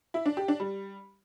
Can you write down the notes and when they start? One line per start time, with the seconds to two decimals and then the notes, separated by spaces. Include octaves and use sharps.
0.14 E4
0.26 D4
0.37 G4
0.48 D4
0.60 G3